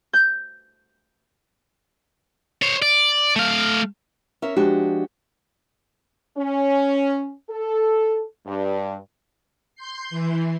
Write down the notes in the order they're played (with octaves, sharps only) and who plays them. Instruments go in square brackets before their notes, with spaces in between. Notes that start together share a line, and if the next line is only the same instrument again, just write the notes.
[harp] G6
[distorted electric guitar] C5 C#5
D5
A3 F5
[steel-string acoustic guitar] C#4 A#4 E5
F3 G#3 D4 F#4 G4
[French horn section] C#4
A4
G2
[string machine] C6 G6 C7
E3